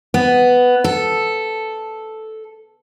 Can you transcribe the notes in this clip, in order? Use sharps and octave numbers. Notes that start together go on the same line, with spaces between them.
B3
A4